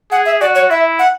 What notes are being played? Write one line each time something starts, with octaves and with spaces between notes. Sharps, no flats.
G#4 F#5
E5
F#4 D5
C#5
E4 E5
F#5